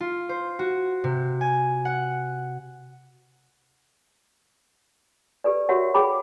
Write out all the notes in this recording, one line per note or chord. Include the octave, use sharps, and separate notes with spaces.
F4
C5
F#4
C3
G#5
F#5
G4 A4 B4 D5
F#4 G4 A#4 C#5 E5 F#5
G#4 A4 C#5 G5 B5 D6